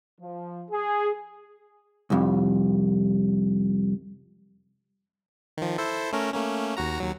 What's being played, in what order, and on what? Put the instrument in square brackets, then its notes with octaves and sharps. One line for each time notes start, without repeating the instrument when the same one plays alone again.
[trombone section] F3
G#4
[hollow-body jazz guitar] C2 F2
[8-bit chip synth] D#3 F3
E4 A4 C5
A3 C#4 A#4
A3 A#3 C#4
D#2 F#4 A#5
D#2 F#3